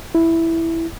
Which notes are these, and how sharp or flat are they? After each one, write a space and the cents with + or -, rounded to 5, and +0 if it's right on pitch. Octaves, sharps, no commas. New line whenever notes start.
E4 +0